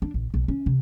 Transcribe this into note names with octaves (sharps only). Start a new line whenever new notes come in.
D4
A#1
B1
C#4
C3